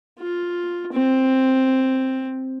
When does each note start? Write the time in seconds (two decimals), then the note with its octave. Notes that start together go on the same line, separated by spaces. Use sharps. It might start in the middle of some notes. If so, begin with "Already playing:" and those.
0.19 F4
0.93 C4